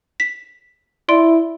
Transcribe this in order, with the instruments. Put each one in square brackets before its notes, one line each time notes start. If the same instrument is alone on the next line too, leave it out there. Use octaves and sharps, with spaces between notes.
[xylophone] B6
[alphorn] E4 [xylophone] D5 C6 D7